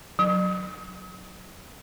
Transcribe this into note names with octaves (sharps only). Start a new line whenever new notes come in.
F#3